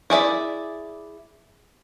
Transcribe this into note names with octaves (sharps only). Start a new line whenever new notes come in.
E4 G#4 D5 E5